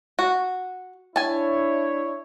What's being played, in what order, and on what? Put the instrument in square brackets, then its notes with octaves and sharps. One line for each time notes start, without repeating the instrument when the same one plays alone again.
[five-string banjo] F#4
[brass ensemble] D4 E4 C#5 [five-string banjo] G#5 A5